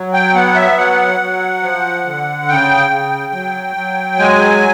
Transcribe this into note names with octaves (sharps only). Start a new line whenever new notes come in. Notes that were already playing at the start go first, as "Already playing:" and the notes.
Already playing: F#3
G5
B3 F#5
E5
F#3 F#5
F#3
F3
D3
C#3 G5
C#3
F#3
F#3
G#3 G#5